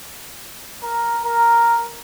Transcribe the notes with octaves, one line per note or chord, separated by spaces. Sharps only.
A#4
A#4